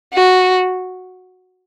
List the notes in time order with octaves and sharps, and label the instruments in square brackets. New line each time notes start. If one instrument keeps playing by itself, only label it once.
[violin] F#4